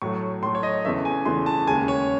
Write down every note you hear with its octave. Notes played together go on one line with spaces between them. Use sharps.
A2 F#3 A3 C#6
A2 F#3 A3 C6
C#5
D#5
E2 C#3 E3 A3 E5
G#5
E2 C#3 E3 A3 C6
A5
D#2 C#3 G#3 G#5
C#5